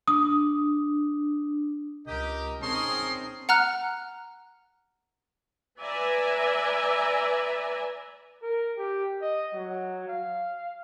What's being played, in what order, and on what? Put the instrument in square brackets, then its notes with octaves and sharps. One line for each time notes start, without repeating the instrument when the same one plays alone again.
[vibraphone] D4 [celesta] D#6
[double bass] C#2 [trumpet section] G4 [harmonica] A#4 D#5
[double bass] C4 D#4 [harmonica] C#4 G#4 A5 [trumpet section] A#4 C6
[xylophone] F#5 A#5 F6 F#6
[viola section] B4 D5 E5 G#5 A#5
[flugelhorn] A#4
G4
D#5
F#3
F5